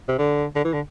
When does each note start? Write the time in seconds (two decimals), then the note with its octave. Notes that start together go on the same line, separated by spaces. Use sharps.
0.08 C3
0.19 D3
0.56 D3
0.65 E3
0.73 D3